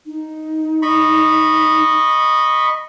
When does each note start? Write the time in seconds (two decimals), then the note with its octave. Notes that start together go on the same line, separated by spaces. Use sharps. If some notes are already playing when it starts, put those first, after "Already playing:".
0.06 D#4
0.82 D#5 B5 C#6